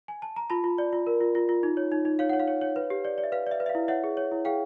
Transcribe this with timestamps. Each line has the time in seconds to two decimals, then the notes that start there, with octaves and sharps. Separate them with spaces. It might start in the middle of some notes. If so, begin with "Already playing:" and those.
0.08 G#5
0.22 A5
0.36 A#5
0.50 F4 A5 B5
0.64 F4
0.78 D5
0.93 F4
1.07 A#4
1.20 F4
1.35 F4
1.49 F4
1.63 D#4
1.77 C#5
1.92 D#4
2.05 D#4
2.19 C#5 F5
2.29 C#5 F#5
2.40 F5
2.48 C#5
2.61 C#5
2.76 B4
2.90 G4
3.05 D5
3.18 D5
3.24 E5
3.32 B4 F5
3.47 D5 E5
3.60 B4
3.66 E5
3.69 F5
3.75 E4
3.88 C#5 E5 F#5
4.04 G#4
4.17 C#5
4.32 E4
4.45 G#4 F5 G5